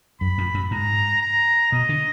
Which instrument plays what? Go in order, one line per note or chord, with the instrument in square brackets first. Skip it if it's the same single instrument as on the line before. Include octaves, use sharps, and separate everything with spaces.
[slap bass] F#2 [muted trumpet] B5
[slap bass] F2
F#2
[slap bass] G#2 [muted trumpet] A#5
[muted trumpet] A#5
[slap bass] B2 [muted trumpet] D#5
[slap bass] D3